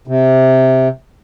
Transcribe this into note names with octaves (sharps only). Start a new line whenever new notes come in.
C3